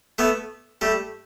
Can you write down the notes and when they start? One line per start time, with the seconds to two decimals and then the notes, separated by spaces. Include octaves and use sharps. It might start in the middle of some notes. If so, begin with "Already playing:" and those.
0.18 A3 B3
0.81 G3 A3